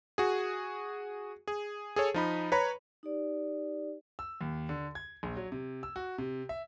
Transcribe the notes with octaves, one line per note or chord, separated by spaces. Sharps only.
F#4 G#4
G#4
G#4 A4 C#5
F3 D#4 B5
B4 C#5 A#5 B5
D#4 G4 D5
E6
D#2
D3
G#6
A#1
F#3
C3
E6
F#4
C3
E5